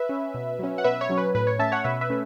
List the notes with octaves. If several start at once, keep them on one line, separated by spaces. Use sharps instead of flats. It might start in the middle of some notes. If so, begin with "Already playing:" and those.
Already playing: B4 E5
C#4
B2
F#3 C#4
F#5
B2 B4 E5
C#5
F#3 C#4
B4
A2 B4
C#5
A3 C#4 E5 A5
C#5 F#5
B2 B4 E5
B4 E5
A3 C#4